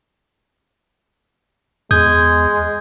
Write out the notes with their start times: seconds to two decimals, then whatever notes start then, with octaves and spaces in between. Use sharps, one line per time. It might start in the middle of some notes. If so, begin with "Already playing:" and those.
1.91 E2 G#3 D#6 G6 G#6